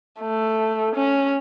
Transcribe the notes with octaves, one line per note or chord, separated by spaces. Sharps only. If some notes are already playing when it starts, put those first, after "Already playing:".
A3
C#4